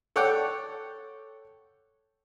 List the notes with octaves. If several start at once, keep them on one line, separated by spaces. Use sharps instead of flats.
A4 C#5 D5 F#5 G5